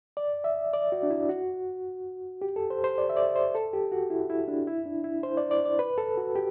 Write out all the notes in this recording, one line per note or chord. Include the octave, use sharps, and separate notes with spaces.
D5
E5
D5
F#4
D4
E4
F#4
G4
A4
C5
C5
D5
E5
D5
C5
A4
G4
F#4
E4
E4
D4
E4
D4
E4
C5
D5
D5
D5
B4
A4
F#4
G4